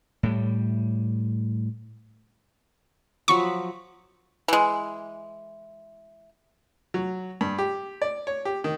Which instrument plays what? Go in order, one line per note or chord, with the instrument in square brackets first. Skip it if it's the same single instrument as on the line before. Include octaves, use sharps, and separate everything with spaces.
[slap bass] A2 G3
[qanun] F3 F#3 B5 [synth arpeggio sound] C#6
[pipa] E3 G#3
[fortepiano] F#3
G2
G4
D5
C#5
G4
D#3